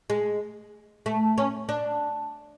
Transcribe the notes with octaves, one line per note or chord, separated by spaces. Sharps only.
G#3
A3
C#4
D4